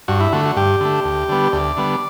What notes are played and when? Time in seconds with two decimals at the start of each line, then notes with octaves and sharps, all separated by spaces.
0.08 G2 F#4
0.20 E4
0.33 D3 A3 F#4
0.45 F#4
0.57 G2 G4
0.81 D3 A3
1.05 D2
1.29 D3 G3 B3
1.53 D2 D5
1.77 D3 G3 B3